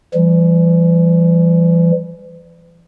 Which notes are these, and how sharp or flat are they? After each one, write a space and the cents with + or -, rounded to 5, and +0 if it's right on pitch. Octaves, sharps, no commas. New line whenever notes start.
E3 +40 G3 +0